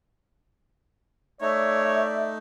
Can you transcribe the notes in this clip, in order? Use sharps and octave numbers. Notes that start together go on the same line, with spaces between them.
A3 D#4 C#5 D5 E5